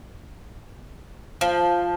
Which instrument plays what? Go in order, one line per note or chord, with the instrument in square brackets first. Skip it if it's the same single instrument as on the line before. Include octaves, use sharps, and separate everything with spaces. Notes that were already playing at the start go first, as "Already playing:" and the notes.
[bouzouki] F3